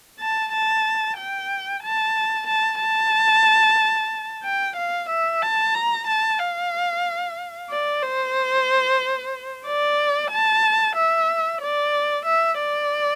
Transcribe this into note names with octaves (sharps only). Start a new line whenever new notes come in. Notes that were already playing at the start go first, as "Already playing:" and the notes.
A5
A5
G5
A5
A5
A5
G5
F5
E5
A5
A#5
A5
F5
D5
C5
D5
A5
E5
D5
E5
D5